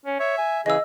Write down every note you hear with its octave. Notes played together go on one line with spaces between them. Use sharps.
C#4
C#5 E5
G#5
C#3 E3 G#4 D#5 E6